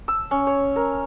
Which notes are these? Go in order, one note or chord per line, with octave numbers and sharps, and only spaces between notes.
E6
C#4
C#5
A#4